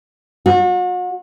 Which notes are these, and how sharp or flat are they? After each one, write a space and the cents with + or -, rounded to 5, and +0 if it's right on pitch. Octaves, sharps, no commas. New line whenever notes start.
F#4 -40